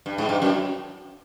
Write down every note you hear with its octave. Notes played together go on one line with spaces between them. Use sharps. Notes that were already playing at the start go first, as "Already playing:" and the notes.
G2
G#2
G2
F#2